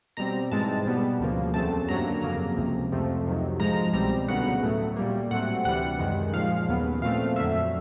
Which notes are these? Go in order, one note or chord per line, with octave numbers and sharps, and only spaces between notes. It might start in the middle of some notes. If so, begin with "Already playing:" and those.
B2 G3 C4 A#5
G#2 E3 G#3 C4 A5
B2 G3 B3
D2 C#3 F3 A#3
E2 C#3 F#3 A3 C4 A5
G2 D3 F#3 A#3 A#5
F2 C#3 F#3 A#3 A#5
C#2 C3 F3
F2 C3 F3 A3
F2 C3 D#3 F#3
G#2 F3 G#3 A#5
C2 B2 G3 C4 A#5
D2 C#3 F#3 B3 F#5
A2 F#3 A3
A#2 G3 A#3
A2 F#3 A3 C4 F#5
D2 C3 E3 G3 F#5
F#2 D#3 G#3
A#2 F3 G#3 F5
D#2 C#3 F#3 B3
A#2 F3 A3 C4 F5
F2 D3 F#3 A3 E5